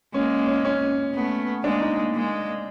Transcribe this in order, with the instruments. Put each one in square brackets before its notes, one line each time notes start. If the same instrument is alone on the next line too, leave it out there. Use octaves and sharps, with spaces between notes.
[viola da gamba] G#3 A#3 [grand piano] C#4
[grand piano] C#4
C#4
[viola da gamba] A3 B3
[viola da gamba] G#3 A#3 [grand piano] D4
[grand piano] D#4
[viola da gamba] G#3 A#3